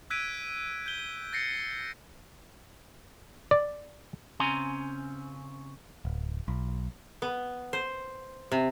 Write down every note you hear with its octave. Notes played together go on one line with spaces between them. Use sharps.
E6 F#6 G#6 B6 D7 D#7
G6 G7
G6 A6 A#6 C7 C#7
D5
C#3 C4 C#4 G#5 A#5 C6
D1
B1
B3
C5
C3